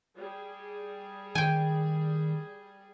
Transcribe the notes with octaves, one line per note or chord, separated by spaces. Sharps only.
G3 G#4
D#3 G5 G#5